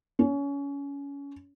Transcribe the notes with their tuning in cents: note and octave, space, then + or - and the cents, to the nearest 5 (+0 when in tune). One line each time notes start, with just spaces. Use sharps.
C#4 +25